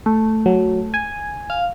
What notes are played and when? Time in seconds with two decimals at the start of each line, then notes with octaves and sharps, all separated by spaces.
0.06 A3
0.46 F#3
0.94 G#5
1.50 F5